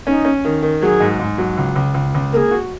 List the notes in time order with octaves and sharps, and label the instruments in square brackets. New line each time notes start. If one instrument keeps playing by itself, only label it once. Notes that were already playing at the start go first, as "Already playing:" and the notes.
[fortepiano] C#4 [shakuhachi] D#4
[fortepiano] C#4
D#3
D#3
[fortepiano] F#3 [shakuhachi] G#4
[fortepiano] G#2
G#2
F#3
C#2
C#2
C#2
C#2
[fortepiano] A#3 [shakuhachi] G#4 A#4
[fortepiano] F#4